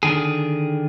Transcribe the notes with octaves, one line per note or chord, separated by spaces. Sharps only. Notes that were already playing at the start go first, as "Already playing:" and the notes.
D3 D#3 G#4